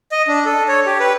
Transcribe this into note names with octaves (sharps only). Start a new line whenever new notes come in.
D#5
D4
A4
C#5
G4
B4